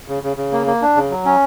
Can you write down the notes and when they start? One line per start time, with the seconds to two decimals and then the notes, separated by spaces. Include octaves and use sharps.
0.08 C#3
0.23 C#3
0.37 C#3
0.52 A#3
0.67 A#3
0.82 D4
0.96 C#3
1.10 F#3
1.25 C#4